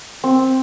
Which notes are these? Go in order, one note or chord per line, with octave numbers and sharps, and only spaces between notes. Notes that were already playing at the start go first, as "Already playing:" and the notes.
C4